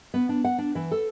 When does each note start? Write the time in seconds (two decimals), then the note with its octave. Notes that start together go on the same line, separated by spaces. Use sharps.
0.14 B3
0.29 D4
0.45 F#5
0.58 D4
0.75 E3
0.91 A4